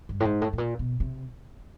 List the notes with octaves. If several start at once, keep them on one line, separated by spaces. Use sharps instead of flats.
G2
A2
G#2
A2
A2
A#2
B2
C3